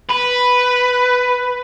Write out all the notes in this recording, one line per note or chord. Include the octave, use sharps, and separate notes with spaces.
B4